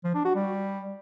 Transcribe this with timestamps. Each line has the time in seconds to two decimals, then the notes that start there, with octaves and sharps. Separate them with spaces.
0.04 F3
0.15 D4
0.25 F#4
0.35 G3